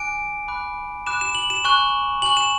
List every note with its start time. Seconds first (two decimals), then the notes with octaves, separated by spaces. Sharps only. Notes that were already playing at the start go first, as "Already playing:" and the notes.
Already playing: G#5 D6 F#6 D7
0.48 B5 D6 F#6
1.06 B5 D6 F#6 E7
1.21 E7
1.35 F#7
1.50 E7
1.64 G#5 C#6 F#6
2.22 G#5 C#6 F#6 F#7
2.37 E7